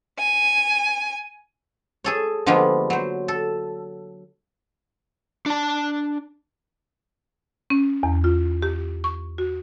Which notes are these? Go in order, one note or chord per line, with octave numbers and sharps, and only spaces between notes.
G#5
G#4 A4 C#5
D3 F3 G3 G#3 A#3 B3
F#3 C5
A4
D4 A5
C#4
E2
F4
G4
C#6
F#4